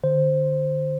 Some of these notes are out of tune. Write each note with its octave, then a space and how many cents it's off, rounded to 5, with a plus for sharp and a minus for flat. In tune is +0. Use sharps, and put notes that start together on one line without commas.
D3 +35 C5 +0